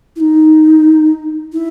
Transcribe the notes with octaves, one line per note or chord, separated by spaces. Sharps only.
E4
D#4
E4